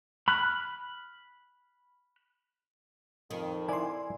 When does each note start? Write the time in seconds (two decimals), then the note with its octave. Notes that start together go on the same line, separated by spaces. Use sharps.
0.28 B5 F6 F#6
3.31 F2 D#3
3.69 E4 D5 G#5 C6